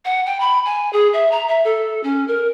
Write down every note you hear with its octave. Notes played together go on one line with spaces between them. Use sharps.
F#5
G5
B5
G#5
G#4
E5
A#5
E5
A4
C#4
A#4